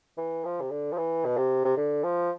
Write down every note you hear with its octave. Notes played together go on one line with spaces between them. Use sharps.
E3
F3
C3
D3
F3
E3
B2
C3
C3
D3
F3